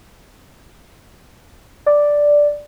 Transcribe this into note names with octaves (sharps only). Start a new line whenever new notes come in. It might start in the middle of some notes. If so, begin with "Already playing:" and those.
D5